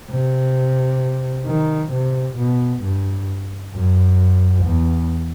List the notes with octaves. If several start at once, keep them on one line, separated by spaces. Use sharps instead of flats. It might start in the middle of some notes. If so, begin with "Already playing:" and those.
C3
D#3
C3
B2
G2
F#2
E2